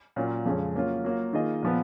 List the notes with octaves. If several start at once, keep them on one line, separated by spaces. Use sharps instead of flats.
A#2 F#3 C#4 F4 A#4
F2 C#3 G#3 C#4
F#3 A#3 C#4 F4
F#3 A#3 F4
D#3 A#3 F4 G#4 D#5
A#2 F3 B3